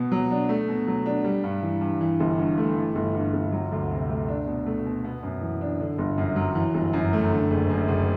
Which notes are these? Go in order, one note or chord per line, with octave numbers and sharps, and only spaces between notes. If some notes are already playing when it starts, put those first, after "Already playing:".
Already playing: B2 B3
F#3
D4
A3
B2
F#3
D4
G3
G2
E3
G2
E3
G1
G2
A3
E3
G1
G2
G1
F#3
D2
C3
A3
D4
B2
A3
B2
B3
F#2
E3
D4
D3
G1
F#2
F#3
E3
G1
F#2
A3
D3
F#1
F#2
F#1